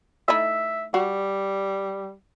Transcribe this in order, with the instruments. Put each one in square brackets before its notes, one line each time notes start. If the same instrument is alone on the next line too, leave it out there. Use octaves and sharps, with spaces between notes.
[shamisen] A3 D#4 E4 [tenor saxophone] E5
[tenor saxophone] G3 [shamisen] F#4